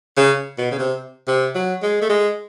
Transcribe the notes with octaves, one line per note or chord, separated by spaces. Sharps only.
C#3
B2
C#3
C3
C3
F#3
G#3
A3
G#3